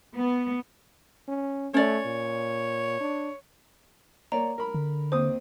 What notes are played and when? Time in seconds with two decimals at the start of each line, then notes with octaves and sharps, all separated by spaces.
0.14 B3
1.28 C#4
1.74 A3 C#4 C#5 D5
2.06 A#2
3.01 D4
4.32 A#3 C#5 D5 A#5
4.58 A#4 B5
4.74 D3
5.12 D#2 C4 C5 D#6